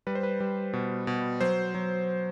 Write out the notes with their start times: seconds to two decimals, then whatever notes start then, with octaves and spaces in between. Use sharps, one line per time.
0.07 G3 B4
0.15 C5
0.23 B4
0.40 G3
0.73 B2
1.07 B2
1.41 F#3 C5
1.75 F#3